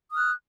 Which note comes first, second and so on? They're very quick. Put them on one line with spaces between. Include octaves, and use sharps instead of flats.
D#6 F6 F#6